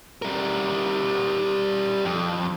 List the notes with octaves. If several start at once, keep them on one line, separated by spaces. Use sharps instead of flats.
G3 A#4
F2